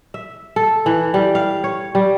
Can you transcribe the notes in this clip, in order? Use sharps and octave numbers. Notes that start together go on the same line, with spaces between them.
E5
A4
E3
G3
F5
C#5
G3